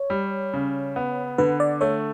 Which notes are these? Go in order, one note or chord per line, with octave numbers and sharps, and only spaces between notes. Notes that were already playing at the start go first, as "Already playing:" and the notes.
Already playing: C#5
G3
C#3
B3
D3 B4
D5
A3 C#5